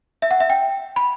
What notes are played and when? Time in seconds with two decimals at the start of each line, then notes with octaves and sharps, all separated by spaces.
0.22 E5
0.31 F#5
0.40 E5
0.50 G5
0.96 B5